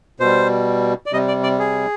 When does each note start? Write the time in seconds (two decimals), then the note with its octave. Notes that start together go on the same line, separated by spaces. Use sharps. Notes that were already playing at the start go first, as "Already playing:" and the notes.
0.20 B2 G3 C5
1.06 D5
1.12 C3 G3 D#5
1.28 D5
1.43 D5
1.59 G#4